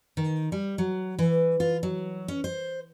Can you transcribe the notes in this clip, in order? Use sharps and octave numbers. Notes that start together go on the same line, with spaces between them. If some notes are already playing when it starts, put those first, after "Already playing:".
D#3
G3
F#3
E3
F4
F#3
C#4
C5